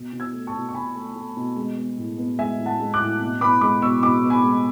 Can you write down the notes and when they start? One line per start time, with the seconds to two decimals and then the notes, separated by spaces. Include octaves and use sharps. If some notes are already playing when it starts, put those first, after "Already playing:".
Already playing: B2
0.13 B2
0.20 E6 G#6
0.33 A3
0.47 A5 C#6
0.54 B2
0.69 C#6
0.74 B2 G#5 B5
0.95 A3
1.16 A3
1.37 B2
1.57 G#3
1.77 B3
1.98 A2
2.18 B3
2.39 G#3 E5 G#5
2.59 A2
2.66 F#5 A5
2.80 G#3
2.94 D6 F#6
3.00 A2
3.21 B2
3.41 B3 B5 D6
3.61 G#3 B5 D6
3.82 B2 C#6 E6
4.03 B2 B5 D6
4.23 B3
4.30 G#5 B5
4.43 G#3